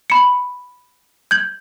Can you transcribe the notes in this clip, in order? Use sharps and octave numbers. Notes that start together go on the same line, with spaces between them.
B5 C#7
G6 G#6 F#7